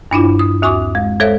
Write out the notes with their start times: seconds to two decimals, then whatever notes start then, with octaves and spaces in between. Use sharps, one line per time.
0.11 G2 D4 E4 F4
0.39 D#6
0.62 D#2 F#4 G#5 C#6 D6
0.95 G#3
1.20 G#3 A4 C5 C#5 E5